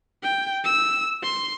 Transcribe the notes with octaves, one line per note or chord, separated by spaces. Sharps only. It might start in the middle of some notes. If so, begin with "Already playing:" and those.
G5
E6
C6